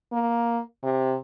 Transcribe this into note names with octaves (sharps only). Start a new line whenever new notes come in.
A#3
C3